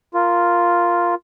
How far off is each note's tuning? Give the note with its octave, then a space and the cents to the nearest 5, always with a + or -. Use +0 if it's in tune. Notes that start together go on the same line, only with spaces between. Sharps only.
F4 +0 A#4 +0